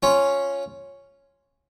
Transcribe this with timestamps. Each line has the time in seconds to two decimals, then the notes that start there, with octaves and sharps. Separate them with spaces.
0.03 C#4 F4